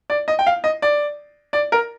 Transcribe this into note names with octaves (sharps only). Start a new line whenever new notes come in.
D5
D#5
G5
F5
D#5
D5
D5
A#4